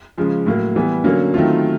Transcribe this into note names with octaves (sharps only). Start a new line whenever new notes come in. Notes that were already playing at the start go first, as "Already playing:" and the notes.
C#3 F3 G#3
A2 F#3 A#3
E3 G3 B3
D3 F#3 A#3 C#4
D#3 F#3 A3 C4 F4